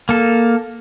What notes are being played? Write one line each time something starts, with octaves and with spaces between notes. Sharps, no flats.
A#3 A4